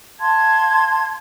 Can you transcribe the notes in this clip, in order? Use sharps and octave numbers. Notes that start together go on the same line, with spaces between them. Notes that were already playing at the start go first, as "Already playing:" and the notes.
F5 A5 C6 G#6